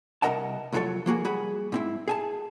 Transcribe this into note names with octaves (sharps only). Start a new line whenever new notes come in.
C2 F#3 A#4 D#5 F#5 A5
C2 F2 F#3 F4 A4 C#5
F3 A#3 F#4 G#4
G3 F#4 G#4 B5
G#2 C4 E4
G#4 G#5 A5